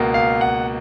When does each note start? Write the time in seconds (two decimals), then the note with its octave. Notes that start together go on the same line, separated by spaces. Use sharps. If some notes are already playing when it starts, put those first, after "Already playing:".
Already playing: C#2 B2 A#3
0.14 F5
0.41 F#5